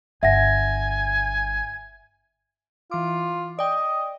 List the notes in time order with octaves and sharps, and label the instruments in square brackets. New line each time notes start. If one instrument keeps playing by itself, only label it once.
[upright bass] G1 [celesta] E5 F#5 A#6 [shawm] G#5
[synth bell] E3 D6 [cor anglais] F4
[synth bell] D5 G5 [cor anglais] D#5